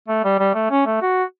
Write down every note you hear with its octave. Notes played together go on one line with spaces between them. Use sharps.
A3
G3
G3
A3
C#4
A3
F#4